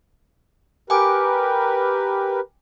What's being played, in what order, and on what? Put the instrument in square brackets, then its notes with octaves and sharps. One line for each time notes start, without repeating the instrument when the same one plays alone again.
[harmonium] G4 A#4 B4 [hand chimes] G5 G#5 D6